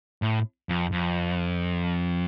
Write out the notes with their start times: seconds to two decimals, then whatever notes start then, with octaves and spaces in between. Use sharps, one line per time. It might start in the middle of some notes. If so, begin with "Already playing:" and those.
0.22 A2
0.69 F2
0.92 F2